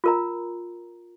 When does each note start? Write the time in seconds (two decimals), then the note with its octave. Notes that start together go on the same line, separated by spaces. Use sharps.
0.04 F4 A#4 A#5